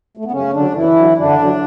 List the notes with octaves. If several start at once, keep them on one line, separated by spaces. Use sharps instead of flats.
A3
B3
F#2 C#3 C#4
D3 F#3 D4
F#2 E3 E4
D3 F#3
F#2 D3 D4
D3 F#3